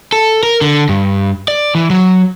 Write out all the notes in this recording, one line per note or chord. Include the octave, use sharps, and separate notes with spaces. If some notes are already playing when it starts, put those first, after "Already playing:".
A4
A#4
D3
G2
D5
E3
F#3